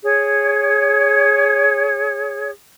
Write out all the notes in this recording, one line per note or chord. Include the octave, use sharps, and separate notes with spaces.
G#4 C#5